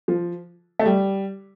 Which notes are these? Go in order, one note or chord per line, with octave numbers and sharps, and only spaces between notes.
F3
A3
G3